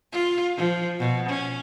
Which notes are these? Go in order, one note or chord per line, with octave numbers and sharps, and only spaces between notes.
F4
F3
B2
C#4